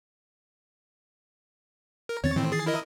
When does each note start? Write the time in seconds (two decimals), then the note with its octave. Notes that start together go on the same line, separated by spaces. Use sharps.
2.09 A#4
2.24 E2 D#3 C4 C#5 A6
2.36 A2 D#3 E3 C4
2.52 G#4 A6 C7
2.66 E4 A#4 D#5